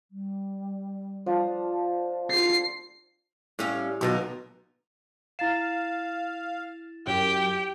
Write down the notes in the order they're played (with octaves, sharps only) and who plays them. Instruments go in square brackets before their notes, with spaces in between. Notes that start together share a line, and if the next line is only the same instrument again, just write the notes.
[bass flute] G3
[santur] F3 D4 D#6
[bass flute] F4 [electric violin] C7
[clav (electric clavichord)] A2 [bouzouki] G3 C#4 F5
[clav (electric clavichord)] B1 B2 [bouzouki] D#3 F4 A#4
[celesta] E4 A6 E7 [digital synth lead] F5
[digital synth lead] F#2 [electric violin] G4 [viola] G5